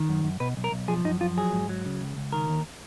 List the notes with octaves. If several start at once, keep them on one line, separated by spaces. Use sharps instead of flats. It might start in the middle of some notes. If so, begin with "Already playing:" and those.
Already playing: D#3
F#2
F#2
B2 B4
B1
A#4
B1
F3 G#4
F#2 D#4
F3 F4
F#3 G#4
G#2
F#3
C#3
C#2
C#2
D#3 A#4
D#2